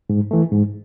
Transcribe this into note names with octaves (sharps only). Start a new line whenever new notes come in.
G#2
E3 A3
G#2